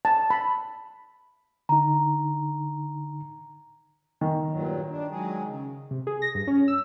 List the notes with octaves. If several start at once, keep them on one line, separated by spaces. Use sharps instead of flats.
A5
B5
D3 D#4 A#5
D#3
G2 A#2 F#3
D4
F#3 G#3 G#4
C#3
C3
G#4
A#6
G2
C#4
E6